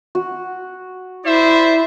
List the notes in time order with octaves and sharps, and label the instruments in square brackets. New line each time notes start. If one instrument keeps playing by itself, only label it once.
[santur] F#4
[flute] E4 [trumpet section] C5 D5 E5